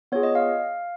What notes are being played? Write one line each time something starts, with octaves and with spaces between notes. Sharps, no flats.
B3 F4 G#4 C#5
D#5
F5